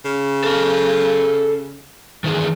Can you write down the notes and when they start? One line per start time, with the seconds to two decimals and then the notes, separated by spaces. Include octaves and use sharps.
0.05 C#3
0.44 A4 F5
2.24 D#3 E3 G#4